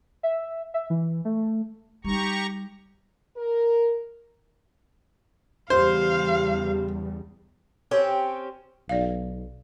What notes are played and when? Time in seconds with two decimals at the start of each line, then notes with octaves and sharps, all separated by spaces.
0.23 E5
0.74 E5
0.90 E3
1.25 A3
2.05 G3 D#4 G4 A#5 C#6
3.37 A#4
5.70 E2 C#3 G3 G4 C5 F5
7.91 C4 C#4 G4 C#5
8.89 B1 D5 F5